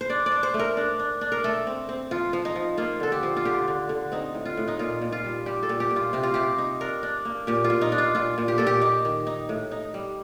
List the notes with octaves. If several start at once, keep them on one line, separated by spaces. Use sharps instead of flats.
C5
D4 D5
D5
D4
C5
A3
A#4
D4
D4
D4
A#4
A3 A4
C4
C4
F3 F4
F3
D#4
F3
A#3 F4
D3 A4
G4
F3
F4
D3 G4
D3
D3
C4 D#4
A2
F4
A2
D#4
A#2 F4
A#2
F4
G3
G3 G4
A4
A#2
G4
A#2
F4
C3 G4
F4
C3 G4
D#4
D4 A#4
D4
A#3
A#2 G4
F4
A#2
D#4
D4
F4
A#2 F4
A#2
G4
A#2 A4
G4
D#4 G4
D#3
D#4
A2
D#4
G3